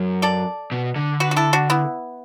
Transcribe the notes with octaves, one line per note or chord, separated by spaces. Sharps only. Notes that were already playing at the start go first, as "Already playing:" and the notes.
Already playing: F#2
A4 D5
B2
D3
F#4 B4
F#4
E4 A4
D4 F#4
B3 E4